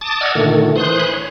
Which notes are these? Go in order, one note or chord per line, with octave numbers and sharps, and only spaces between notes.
A5 D6 D#6 A6
D5 D#5 F#5 E6 F6 G#6
A#2 D3 D#3 A3
E3 C5 C6 D#6 F#6
G#5 B5 C6 F#6
C#5